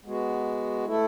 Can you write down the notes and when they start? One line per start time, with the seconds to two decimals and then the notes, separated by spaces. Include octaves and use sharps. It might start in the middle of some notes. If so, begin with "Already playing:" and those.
0.05 G#3 B3 F#4
0.85 A3 E4 A4